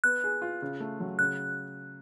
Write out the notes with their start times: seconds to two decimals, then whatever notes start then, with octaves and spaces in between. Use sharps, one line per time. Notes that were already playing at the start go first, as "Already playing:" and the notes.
0.04 B3 F#6
0.24 G#4
0.42 F4
0.62 C#3
0.80 A3
1.00 F#3
1.19 C#3 F#6